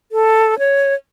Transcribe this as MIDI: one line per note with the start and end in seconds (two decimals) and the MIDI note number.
0.12 0.58 69
0.59 0.94 73